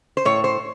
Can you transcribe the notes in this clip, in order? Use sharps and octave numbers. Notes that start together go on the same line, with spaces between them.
C5
A2 C#5
C5